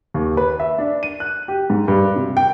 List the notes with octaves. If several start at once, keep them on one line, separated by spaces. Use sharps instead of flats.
D#2
B4
E5
D4
D#7
F#6
G4
G#2
G2
C3
G5